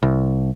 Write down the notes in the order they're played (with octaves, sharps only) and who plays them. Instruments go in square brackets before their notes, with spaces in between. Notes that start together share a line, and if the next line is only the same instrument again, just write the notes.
[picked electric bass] C2